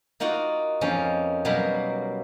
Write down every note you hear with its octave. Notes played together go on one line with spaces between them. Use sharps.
A#3 D#4 F4 F#4 F#5
F2 F3 A#3 C#4 D#4
B2 F#3 G3 A#3 A#4